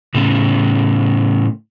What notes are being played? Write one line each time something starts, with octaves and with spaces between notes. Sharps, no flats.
A2 C#3